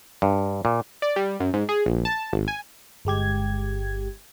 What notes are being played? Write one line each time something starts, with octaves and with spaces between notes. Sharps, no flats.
G2
A#2
D5
G3
F#2
G#2
G#4
A#1
A5
G#1
G#5
G1 G#3 G4 G#6